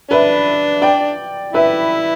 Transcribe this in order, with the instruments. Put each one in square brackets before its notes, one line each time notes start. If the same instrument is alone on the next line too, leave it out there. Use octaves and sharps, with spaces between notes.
[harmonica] D4 [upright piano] B4 E5
[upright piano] D5 G5
[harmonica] E4 [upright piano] B4 E5